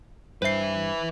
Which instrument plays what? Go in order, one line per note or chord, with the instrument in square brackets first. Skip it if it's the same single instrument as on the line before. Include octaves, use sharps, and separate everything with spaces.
[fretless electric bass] G2 [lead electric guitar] B4 E5 [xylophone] C5 C7